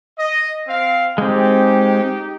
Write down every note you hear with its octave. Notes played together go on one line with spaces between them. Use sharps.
D#5
C4 F5
G#3 C4 D#4 G4